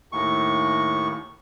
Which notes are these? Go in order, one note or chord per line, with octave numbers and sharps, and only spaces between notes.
D#2 A2 C#6